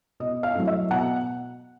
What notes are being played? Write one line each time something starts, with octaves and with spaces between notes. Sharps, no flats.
B2 D#5
F5
F#3 A3 C4 E4
E5
B2 F#5